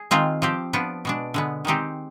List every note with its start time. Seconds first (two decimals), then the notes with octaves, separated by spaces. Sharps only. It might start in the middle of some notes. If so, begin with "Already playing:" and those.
Already playing: G#4
0.11 D#3 G#3 C4 F4
0.42 F3 C4 G4
0.73 F3 B3 D4
1.05 B2 G#3 D4
1.34 D3 G#3 B3
1.65 D#3 G#3 C4 D#4 G4